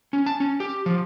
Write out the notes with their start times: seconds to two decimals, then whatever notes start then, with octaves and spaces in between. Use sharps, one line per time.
0.13 C#4
0.26 A5
0.40 C#4
0.60 G4
0.86 F3